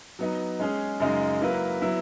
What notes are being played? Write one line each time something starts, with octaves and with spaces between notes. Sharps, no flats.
F#3 B3 D#4
G#3 C#4 G#4
F#2 C#3 G#3 D#4 G#4
F#3 A#3 E4 B4
F#3 B3 E4